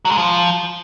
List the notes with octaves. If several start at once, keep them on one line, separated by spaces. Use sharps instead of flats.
F#3
G#3
F3